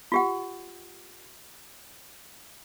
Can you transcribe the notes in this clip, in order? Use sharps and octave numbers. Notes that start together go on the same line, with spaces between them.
F4 G4 F#5